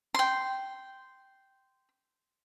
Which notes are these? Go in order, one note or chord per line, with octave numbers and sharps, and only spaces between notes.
G5 C6